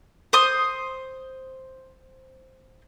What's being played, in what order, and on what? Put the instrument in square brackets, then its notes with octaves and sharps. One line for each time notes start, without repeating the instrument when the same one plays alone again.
[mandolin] C5 C6 D#6